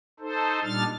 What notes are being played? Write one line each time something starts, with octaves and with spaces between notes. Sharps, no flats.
D#4 A4 C5
A#2 G3 D4 D#4 F6 A6